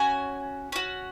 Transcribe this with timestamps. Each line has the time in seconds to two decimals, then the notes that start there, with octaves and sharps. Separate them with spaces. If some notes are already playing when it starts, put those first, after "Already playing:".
Already playing: C#4 F#4 G#5
0.72 C#4 F#4